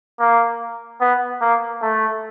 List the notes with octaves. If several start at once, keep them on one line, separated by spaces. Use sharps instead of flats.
A#3
B3
A#3
A3